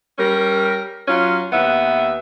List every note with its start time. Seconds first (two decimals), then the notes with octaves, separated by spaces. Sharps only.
0.18 G3 C#4 A#4
1.08 F#3 C#4 F4
1.52 D#2 B3 E5